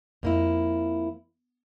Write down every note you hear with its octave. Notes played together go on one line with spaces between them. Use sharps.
F2 A#3 E4